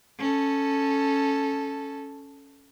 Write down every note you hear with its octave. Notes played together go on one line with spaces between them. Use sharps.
C#4 A4